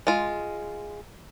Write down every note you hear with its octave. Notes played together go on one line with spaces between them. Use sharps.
G#3 F4